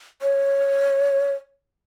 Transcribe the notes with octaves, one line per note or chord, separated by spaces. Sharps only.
C#5